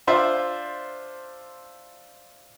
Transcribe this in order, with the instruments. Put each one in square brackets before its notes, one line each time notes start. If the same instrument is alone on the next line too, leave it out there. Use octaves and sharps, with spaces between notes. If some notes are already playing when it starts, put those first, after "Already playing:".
[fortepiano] D4 F4 C5 E5